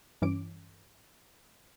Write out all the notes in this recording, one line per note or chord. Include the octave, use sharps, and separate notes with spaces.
G2 E3 C#4 D6 D7